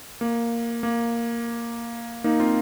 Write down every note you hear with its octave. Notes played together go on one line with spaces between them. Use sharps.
A#3
A#3
A#3 D#4
C4 F4